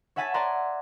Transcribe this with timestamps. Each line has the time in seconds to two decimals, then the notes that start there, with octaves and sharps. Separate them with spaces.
0.16 C#5 E5 F#5 G#5 A5 B6
0.34 D5 F#5 G#5 A#5 C6